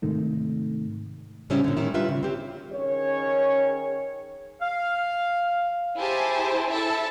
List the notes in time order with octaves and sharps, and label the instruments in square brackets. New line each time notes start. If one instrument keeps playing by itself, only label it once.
[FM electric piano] G#2 C3 D#3 A3
[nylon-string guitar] A2 C#3 G3 C4 C#4 E4
A#2 D3
A2 D#3 G3 C#4 E4
G3 F4 B4 E5
C#3
C4 G4
[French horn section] D#3 C#4 G#4 A#4 C#5
[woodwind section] F5
[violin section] E4 G4 G#4 C5 G#5 A5
E4 A4 E5 A5